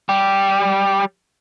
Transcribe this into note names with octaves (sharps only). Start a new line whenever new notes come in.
G3 G4